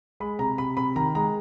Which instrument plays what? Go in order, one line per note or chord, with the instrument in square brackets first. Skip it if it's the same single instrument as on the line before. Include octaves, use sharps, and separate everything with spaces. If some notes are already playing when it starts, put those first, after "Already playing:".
[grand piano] G#3 B5
C3 A#5
C3 B5
C3 B5
D#3 A#5
G#3 A#5